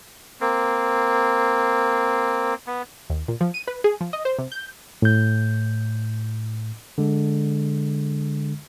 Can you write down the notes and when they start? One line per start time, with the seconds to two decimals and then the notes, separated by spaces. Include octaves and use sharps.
0.41 A#3 C4
2.67 B3
3.10 D#2
3.28 A#2
3.41 F3
3.54 D#7
3.67 B4
3.84 G#4
4.01 F3
4.13 D#5
4.25 C5
4.39 C3
4.52 G6
5.02 A2 G6
6.98 D3 G#3